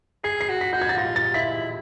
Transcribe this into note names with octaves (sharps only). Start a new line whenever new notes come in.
G#4 C7
C7
F#4
B6
F#4 G6
G#6
A6
F4 A#6
A6
E4 B6